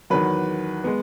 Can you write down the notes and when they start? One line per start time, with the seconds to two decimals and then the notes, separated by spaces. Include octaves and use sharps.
0.10 E2 D#3 F#3 B4
0.84 G#3 B3